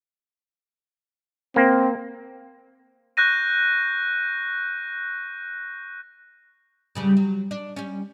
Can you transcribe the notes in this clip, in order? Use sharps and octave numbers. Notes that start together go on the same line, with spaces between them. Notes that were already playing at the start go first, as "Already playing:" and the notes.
A#3 C4
C#6 F#6 G6 A#6 D#7
G2 C#3 G3
F#3
D4
G3 C#4